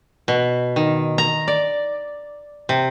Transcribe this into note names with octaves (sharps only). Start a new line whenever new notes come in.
B2
D#3
A#5
D5
C3